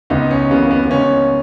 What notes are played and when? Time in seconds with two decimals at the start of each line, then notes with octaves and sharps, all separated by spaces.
0.10 C#2 B3 D#4
0.31 C#4
0.50 C#3 E3 A#3 B3
0.71 B3
0.84 B3
0.90 C#2 C#4